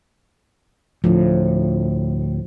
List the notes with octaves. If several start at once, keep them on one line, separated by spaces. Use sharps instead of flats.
D2 A2 F3